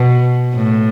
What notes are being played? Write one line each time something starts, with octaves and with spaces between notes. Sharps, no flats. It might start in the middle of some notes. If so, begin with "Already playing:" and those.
Already playing: B2
A2